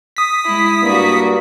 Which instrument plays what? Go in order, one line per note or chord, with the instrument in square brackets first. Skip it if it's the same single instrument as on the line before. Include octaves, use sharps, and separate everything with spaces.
[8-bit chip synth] D#6 B6
[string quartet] G#3 E4
[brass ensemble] G2 A#3 [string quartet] F#4 D5